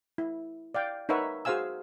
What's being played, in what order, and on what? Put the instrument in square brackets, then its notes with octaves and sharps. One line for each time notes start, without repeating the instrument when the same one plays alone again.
[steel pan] E4
D5 F5 G5
D#4 A#4 B4 C#5 E5 F#5
F#4 G#4 C5 F5 G#5 E6